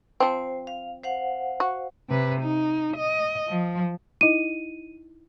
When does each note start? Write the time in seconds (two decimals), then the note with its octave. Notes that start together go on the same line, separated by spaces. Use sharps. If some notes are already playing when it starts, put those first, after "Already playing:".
0.20 F3 C4 C5
0.67 F5
1.03 C5 F5 F#5
1.60 F#4
2.10 C3 B4
2.41 D#4
2.97 D#5
3.48 F3
4.21 D#4 E4 D#5 D#7